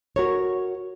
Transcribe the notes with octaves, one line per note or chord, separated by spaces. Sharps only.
F#4 A#4 C#5